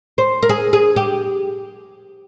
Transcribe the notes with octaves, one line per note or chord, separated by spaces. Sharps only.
C5
A#4
G#4
G#4
G4